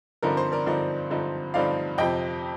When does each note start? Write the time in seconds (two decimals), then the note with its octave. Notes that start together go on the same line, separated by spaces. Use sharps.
0.22 G2 D3 F3 C4 D#4 A#4
0.37 C5
0.52 A#4 D5
0.66 G2 D3 F3 C4 D#4 A#4 D5
1.10 G2 D3 F3 C4 D#4
1.54 G2 D3 F3 C4 D#4 D5 F5
1.98 F2 C3 F3 D#5 G5